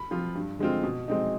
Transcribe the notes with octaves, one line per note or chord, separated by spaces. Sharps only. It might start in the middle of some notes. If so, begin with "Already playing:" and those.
Already playing: B5
F3 C4 F4
G2
D3 G#3 C4 F4
B2
G#3 C4 D#4